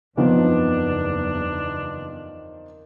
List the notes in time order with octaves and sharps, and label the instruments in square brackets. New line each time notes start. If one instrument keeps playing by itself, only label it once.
[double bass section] F#1 E2 [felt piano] D#3 F3 C4 [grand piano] B3 [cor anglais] D4